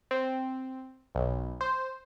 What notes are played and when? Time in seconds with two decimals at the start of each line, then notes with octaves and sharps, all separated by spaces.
0.11 C4
1.15 B1
1.61 C5